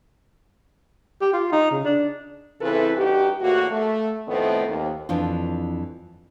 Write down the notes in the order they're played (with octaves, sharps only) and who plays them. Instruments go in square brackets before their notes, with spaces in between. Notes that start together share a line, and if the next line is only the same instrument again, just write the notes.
[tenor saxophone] G4
F4
D#4
C#3
D4
[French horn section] C#3 E3 C4 E4 A4 B4
G2 D#4 F#4 G4
E2 A2 A#3 F#4
A3
F2 A2 D#3 A3 B3 C4
D#2
[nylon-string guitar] F2 E3 D4 F4